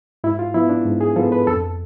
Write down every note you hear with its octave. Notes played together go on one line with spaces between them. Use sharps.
G#2 E4
F4
F3 B3 E4
D4
G#2
G#4
F3 B3 A4
B4
F2 A4